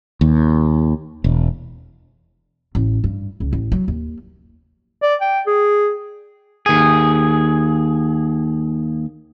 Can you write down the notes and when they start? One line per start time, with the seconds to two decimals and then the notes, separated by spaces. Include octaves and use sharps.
0.21 D#2
1.24 E1
2.75 A1
3.04 G2
3.40 C#2
3.53 A1
3.72 F#3
3.88 D#2
5.02 D5
5.21 G5
5.47 G#4
6.66 D#2 G#4